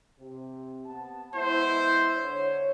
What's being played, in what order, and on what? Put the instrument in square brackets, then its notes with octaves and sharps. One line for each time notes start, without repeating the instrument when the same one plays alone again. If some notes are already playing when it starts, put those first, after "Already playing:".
[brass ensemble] C3
B3 A5
[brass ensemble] G#3 B3 E4 [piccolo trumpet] C5
[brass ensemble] D3 C#5